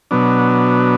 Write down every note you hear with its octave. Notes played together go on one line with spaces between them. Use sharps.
B2 F#3 B3 D4